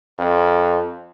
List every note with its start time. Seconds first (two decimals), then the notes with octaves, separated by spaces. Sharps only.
0.19 F2